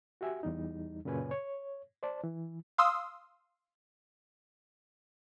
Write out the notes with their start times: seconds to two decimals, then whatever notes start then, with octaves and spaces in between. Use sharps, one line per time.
0.21 F#4 G4 E5 G#5
0.43 E2 G3 D#4
1.05 F#2 A#2 C#3 B4 C#5 G#5
1.31 C#5
2.03 C5 D5 A5
2.24 E3
2.78 F5 C6 D#6 E6